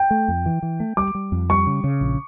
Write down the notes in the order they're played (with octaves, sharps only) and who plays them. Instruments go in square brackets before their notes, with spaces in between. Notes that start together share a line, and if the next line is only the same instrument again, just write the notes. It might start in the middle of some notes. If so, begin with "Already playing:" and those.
Already playing: [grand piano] G5
[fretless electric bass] A3
F2
E3
E3
A3
[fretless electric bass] G3 [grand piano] D6
[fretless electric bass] G3
F2
[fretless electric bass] G3 [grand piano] C#6
[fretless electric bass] C#3
C#3
A#1